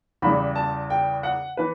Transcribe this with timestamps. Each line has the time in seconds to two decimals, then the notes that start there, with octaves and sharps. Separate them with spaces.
0.22 E2 C#3 E3 G3 B5
0.56 A5
0.90 G5
1.23 F#5
1.57 E3 B4